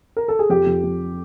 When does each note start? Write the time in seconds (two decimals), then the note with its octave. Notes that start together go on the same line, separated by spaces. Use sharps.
0.17 A#4
0.28 A4
0.39 G#4
0.50 F2 G4
0.67 F2
0.84 F2